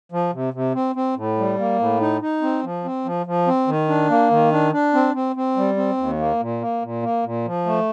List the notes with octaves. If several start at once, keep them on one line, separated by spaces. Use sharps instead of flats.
F3
C3
C3
C4
C4
A2
G3
A#3
A2
D#4
D#4
C4
F3
C4
F3
F3
C4
D#3
D4
A#3
D#3
D4
D4
C4
C4
C4
G3
C4
D#2
A#3
A#2
A#3
A#2
A#3
A#2
F3
A3